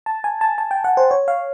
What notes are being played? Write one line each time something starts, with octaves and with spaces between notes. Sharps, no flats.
A5
G#5
A5
A5
G5
F#5
C5
C#5
F5